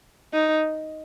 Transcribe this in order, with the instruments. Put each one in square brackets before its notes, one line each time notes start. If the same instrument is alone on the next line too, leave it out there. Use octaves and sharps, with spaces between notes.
[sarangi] D#4